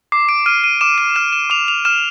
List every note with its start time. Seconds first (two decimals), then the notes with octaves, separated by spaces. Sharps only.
0.12 D6 C7
0.29 D7
0.46 F6 D#7
0.64 D#7
0.81 D6 E7
0.98 D#7
1.16 F6 E7
1.33 E7
1.50 D6 F7
1.68 F7
1.85 F6 E7